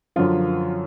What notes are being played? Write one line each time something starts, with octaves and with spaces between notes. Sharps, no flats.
F#2 D3 F3 F4